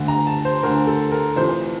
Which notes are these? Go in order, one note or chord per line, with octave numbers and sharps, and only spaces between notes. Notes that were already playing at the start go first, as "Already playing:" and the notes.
Already playing: D2 D3
A#5
A5
C5
D2 D3 A#4
A4
A#4
F1 F2 E3 C5